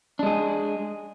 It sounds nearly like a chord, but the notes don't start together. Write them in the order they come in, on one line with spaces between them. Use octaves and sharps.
D4 G#3 G#4